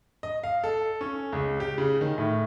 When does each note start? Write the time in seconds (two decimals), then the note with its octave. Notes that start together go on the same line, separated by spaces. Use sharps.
0.23 D#5
0.44 F5
0.64 A4
1.01 C#4
1.32 C#2
1.60 G4
1.78 C#3
2.01 D#3
2.18 A2